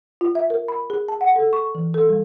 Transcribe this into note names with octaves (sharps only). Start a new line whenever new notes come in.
F4
E5
A#4
B5
G#4
A5
F#5
A4
C#6
E3
A4
G3